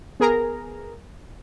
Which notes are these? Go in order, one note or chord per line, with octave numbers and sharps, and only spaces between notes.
B3 G#4 A#4 A#5